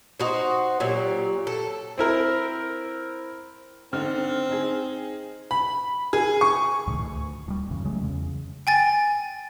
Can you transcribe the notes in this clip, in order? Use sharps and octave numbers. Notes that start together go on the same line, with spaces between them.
D#4 F#4 C5
A#2 F#3 G4
A4
C4 E4 A#4
D3 C4 D#4 F6
D#4 G#4
B5
G#4
C#6
C#2 A2 C3 D#3
D2
D1 F3 G3
B1 F#2 C#3 E3
C#3 F#3 G#3 A3
E2 C#3
G5 G#5 A6